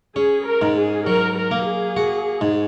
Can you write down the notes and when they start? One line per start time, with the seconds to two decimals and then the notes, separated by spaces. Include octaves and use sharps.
0.16 C#4 G#4
0.46 A#4
0.62 G#2
0.77 G#4
1.06 F#3 A#4
1.36 A#4
1.51 A#3
1.67 G#4
1.97 F#4
2.41 G#2